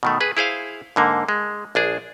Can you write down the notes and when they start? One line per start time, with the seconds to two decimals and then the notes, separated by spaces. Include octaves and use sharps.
0.03 B2 D#3 A3
0.21 G#4 B4
0.37 E4 G#4 C5 F5
0.96 G#2 D3 A#3
1.29 G#3
1.75 A#1 D4 G#4